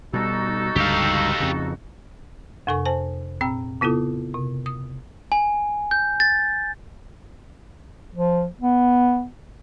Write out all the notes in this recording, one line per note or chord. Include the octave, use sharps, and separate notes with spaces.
B2 G3 D#4 F#4 A4
C#2 G2 D3 G4 F5
F2 C#3
F2 C3 A4 G#5 C#6
C5 G#5 A5
A#2 C4 G5 E6
C#3 B3 E4 F4 A4
C3
D#6
G#5
G6
A6
F3
B3